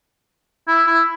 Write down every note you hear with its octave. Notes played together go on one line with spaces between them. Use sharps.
E4
E4